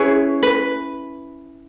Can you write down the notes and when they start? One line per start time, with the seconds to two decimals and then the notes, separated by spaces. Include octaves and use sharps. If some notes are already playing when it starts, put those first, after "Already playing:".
Already playing: C#4 E4 G#4 B4 C#5
0.43 B4